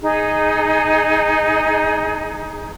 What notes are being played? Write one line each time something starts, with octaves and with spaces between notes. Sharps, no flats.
D#4 G#4